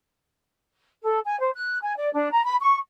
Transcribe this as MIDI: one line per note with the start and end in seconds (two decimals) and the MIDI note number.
1.04 1.18 69
1.24 1.38 80
1.40 1.50 72
1.54 1.78 90
1.82 1.96 80
1.97 2.11 74
2.13 2.31 62
2.31 2.44 82
2.44 2.55 83
2.60 2.77 85